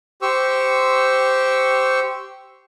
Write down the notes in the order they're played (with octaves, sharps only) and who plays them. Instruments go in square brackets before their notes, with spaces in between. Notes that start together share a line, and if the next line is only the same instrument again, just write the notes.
[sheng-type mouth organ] G4 C5 C#6 E6